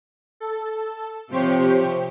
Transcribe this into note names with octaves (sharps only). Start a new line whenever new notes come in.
A4
C3 F3 G4 C5 C#5